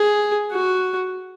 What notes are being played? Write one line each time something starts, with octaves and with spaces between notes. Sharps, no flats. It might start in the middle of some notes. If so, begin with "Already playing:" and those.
Already playing: G#4
F#4